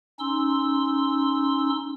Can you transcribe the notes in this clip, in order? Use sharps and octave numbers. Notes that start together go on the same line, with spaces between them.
C#4 D#4 C6 E6